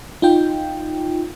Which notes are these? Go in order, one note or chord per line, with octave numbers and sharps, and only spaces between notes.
D#4 F4 G5